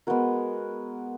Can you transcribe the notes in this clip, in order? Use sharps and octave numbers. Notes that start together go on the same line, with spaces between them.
G#3 B3 F#4 A#4